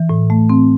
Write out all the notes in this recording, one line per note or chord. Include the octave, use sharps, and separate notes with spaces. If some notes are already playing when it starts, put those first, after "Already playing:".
Already playing: E3
A2
A3
C4